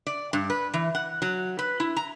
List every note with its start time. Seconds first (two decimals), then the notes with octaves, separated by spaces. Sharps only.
0.07 D5
0.33 G2
0.50 B4
0.74 E3
0.95 F#5
1.22 F#3
1.59 B4
1.80 E4
1.97 A#5